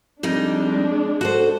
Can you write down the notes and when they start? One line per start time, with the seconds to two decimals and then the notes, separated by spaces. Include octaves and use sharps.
0.23 F2 G3 G#3 D4 D#4
1.21 F#4 A4 C5